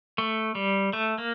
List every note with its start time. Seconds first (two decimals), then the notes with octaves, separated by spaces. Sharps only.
0.18 A3
0.55 G3
0.93 A3
1.18 A#3